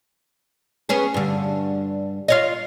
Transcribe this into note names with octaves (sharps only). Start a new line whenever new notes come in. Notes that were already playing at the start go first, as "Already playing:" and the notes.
B3 C#4 G#4
G2 D3
F4 C#5 D#5